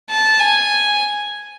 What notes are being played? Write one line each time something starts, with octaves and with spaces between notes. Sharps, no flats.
A5
G#5